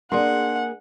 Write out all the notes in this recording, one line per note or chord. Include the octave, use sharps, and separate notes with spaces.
A#3 D4 G#4 D5 F#5 C6